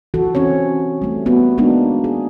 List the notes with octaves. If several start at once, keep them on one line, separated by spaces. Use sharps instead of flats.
E3 F#4 A4
C4 C#4 F#4 C#5
G3 A3
A#3 B3 F#4
G#3 A#3 B3 D4 D#4 F#4
G#4